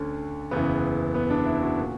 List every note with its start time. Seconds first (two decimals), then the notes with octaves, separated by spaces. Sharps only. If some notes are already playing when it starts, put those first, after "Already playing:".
Already playing: D2 D3 C#4
0.51 F#1 E2 C#3 E3 B3
1.15 B3
1.30 D4
1.46 E4
1.62 F#4
1.80 A#2